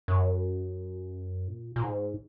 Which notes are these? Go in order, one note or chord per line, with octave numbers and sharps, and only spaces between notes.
F#2
A#2
A#2
G#2